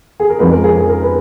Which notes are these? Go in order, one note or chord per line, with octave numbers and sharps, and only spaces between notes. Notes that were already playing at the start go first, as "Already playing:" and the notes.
G#4
A#4
F2 F3 G#3 B4
A#4
G#4
G#4
A#4
B4